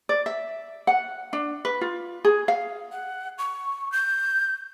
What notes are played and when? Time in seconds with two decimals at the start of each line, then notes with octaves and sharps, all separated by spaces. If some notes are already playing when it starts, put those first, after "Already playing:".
0.09 D5
0.26 E5
0.87 F#5
1.33 D4
1.65 B4
1.81 F4
2.25 G#4
2.48 F5
2.92 F#5
3.38 C#6
3.92 G6